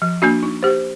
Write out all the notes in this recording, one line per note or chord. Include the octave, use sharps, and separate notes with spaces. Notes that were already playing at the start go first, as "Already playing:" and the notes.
F3
A#3 D4 F#4
D#4
G4 C5